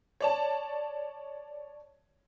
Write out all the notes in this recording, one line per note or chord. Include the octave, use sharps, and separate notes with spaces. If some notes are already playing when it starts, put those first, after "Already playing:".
C#5 D5 A5